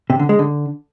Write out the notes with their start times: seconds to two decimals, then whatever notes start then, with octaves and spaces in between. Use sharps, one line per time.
0.10 C3
0.19 D3
0.29 G#3
0.39 D3